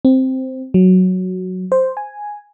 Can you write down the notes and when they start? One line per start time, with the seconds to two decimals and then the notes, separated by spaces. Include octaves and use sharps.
0.05 C4
0.74 F#3
1.72 C5
1.97 G#5